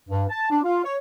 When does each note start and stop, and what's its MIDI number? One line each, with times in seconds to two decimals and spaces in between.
0.09 0.24 43
0.29 0.51 81
0.51 0.59 62
0.63 0.84 65
0.84 0.96 73